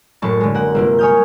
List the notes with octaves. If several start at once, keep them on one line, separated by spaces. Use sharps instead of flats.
F#1 A2 A5 C#6
D3 G#3
A#3 F#5
G1 C3 A#3
C#5 G#5 D#6 F6 G6